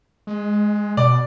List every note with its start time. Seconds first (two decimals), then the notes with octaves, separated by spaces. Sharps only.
0.27 G#3
0.97 B2 D5